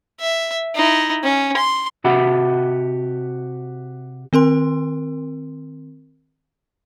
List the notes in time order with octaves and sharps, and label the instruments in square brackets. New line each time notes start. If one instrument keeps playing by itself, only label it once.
[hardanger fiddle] E5
D#4 E4
C#4
C6
[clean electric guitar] C3 F#4 G4 E5 F#5 B5
[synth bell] D#3 C4 A#4 C6